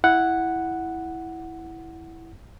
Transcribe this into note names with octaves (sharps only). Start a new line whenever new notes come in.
E4 F#5